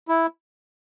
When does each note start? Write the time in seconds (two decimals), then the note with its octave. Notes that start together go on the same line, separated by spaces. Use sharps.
0.08 E4